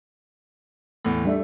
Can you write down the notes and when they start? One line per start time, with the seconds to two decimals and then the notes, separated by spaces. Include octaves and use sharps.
1.05 E2 A2
1.25 G3 A3 D4 E5